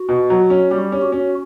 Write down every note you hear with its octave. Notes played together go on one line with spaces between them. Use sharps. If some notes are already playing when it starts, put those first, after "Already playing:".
Already playing: F#4
B2
F#3
C#4
G3 G4
C#4
F#4
C#4